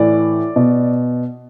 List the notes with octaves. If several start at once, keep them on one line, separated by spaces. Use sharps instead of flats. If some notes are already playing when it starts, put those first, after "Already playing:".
Already playing: A2 E3 D5
B2